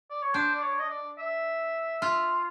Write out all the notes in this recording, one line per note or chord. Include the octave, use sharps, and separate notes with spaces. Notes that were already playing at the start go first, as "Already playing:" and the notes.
D5
C#5
D4 C5
D5
C#5
D#5
D5
E5
F4